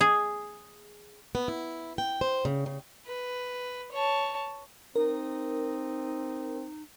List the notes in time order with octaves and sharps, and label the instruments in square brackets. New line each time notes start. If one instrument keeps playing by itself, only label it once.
[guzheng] G#4
[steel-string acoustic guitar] B3
E4
G5
C5
C#3
C#3
[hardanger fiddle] B4
C#5 A5
[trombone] C4 [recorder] D#4 [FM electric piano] A#4